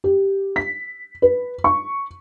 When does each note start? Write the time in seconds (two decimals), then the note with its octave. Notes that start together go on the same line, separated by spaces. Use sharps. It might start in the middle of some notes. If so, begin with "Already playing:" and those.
0.04 G4
0.56 B6
1.22 B4
1.64 C#6